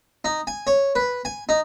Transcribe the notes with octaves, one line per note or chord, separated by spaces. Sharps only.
D#4
G#5
C#5
B4
G#5
D#4